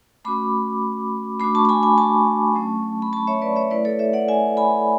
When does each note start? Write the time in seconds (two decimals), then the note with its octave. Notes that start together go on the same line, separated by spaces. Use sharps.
0.25 A3 C#4 F#4 B5 D6
1.40 A3 D4 F#4 B5 D6
1.55 A5 C#6
1.65 A5
1.69 G#5 B5
1.83 G#5 B5
1.98 A5 C#6
2.55 F#3 A3 C#4
3.02 B5
3.13 A5 C#6
3.27 C#5 E5
3.42 B4 D5
3.56 C#5 E5
3.71 A3 E4 B4 D5
3.85 A4 C#5
3.99 C#5 E5
4.13 D5 F#5
4.28 E5 G#5
4.57 G#5 B5